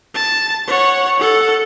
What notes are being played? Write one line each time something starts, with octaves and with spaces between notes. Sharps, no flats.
A5
C#5 F#5
A4 F#5